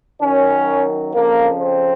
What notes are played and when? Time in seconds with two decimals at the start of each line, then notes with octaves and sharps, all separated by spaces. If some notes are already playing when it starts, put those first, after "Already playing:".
0.22 F#2 D#3 F#3 C#4
1.14 F2 C#3 F3 A#3
1.60 C4